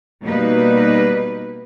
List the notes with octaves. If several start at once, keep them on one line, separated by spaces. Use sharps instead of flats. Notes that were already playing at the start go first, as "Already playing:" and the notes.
B2 G3 A#3 D#4 B4